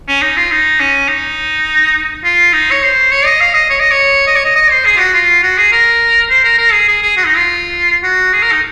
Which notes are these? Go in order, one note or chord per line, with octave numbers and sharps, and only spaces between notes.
C#4
D#4
F4
D#4
C#4
D#4
F4
D#4
C#5
C5
C#5
D#5
F5
D#5
C#5
D#5
C#5
D#5
C#5
D#5
D#5
C5
G#4
F4
F#4
F4
F#4
G#4
A#4
C5
A#4
A#4
G#4
G#4
G#4
F#4
D#4
F4
F#4
G#4
A#4
D#4